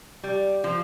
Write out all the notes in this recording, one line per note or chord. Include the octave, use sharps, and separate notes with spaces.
G3
F3